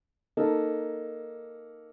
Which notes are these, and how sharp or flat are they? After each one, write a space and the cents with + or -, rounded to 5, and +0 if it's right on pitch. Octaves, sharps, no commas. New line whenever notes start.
A#3 +0 D#4 -5 A4 +0